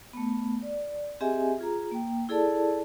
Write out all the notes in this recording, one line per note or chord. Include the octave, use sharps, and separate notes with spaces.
A3 B3
D5
C4 G4 G#4 D#5 E5 G#5
F4 G#4 A#5
A#3 G5
E4 G#4 A4 D5 A5